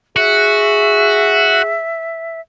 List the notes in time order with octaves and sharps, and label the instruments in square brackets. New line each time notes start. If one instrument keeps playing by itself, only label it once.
[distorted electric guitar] F#4 [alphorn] G#4 [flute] E5